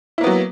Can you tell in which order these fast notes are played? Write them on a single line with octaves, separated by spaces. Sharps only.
E4 A#3 B3 F#3